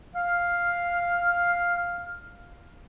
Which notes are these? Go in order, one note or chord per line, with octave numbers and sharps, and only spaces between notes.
F5 F6